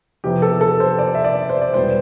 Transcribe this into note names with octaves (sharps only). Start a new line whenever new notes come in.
F2 C3 E3 B3 G4
A4
A4
C5
D5
E5
D5
C5
D5
E1 E2 B2 G3 B3 C5